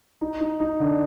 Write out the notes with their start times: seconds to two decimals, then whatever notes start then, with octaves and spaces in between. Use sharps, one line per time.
0.21 D#4
0.40 D#4
0.60 D#4
0.80 D3